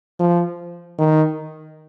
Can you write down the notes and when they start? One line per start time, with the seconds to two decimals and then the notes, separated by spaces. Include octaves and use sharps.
0.20 F3
0.99 D#3